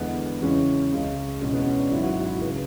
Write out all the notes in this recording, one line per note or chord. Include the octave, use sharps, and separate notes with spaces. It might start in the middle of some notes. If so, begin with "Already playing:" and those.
Already playing: E2 D3 G#3 B3
E2 C#3 E3 G#3 C#4
C#2 C#3 G#3
E2 B2 G#3 C#4
B3
C#4
D4
G#1 G#2 F#3 E4
F#4
F#4
E4
C#3 B4